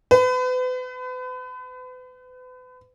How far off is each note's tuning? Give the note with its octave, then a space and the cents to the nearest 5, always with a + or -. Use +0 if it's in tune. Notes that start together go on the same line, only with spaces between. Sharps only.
B4 +40